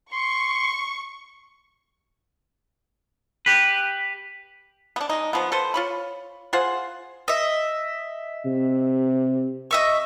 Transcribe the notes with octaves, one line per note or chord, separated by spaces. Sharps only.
C6 C#6
G4 B4
B3 D4
G#3 D#4
D3 F3 B3
A4 B4 C5
F4 C#5 B5
F4 G#4 C5 F#5
D#5 E5
C3
D#5 E5 C#6